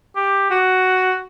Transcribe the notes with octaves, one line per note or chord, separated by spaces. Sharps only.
G4
F#4